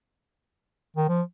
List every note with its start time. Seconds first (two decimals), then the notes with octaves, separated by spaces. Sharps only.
0.96 D#3
1.09 F3